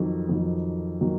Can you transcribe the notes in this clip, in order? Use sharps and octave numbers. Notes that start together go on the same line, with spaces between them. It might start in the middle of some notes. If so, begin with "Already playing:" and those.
Already playing: F2 D#3 F#3
F2 D#3 F#3
D#3 F#3